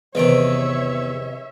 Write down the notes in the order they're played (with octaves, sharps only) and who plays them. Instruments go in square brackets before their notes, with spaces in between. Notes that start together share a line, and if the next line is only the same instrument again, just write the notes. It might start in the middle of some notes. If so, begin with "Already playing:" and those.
[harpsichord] E2 D#3 [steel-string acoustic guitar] C3 D#5 [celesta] B4 D7 [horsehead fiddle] C#5 E5